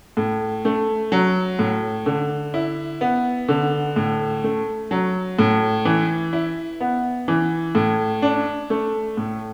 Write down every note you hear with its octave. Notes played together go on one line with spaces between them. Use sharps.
A2
A3
F#3
A2
D3
E4
B3
D3
A2
A3
F#3
A2
E3
E4
B3
E3
A2
D4
A3
A2